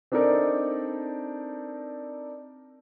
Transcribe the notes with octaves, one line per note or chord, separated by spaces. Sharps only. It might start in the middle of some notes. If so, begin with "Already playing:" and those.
C4 D4 D#4 A4 A#4 D5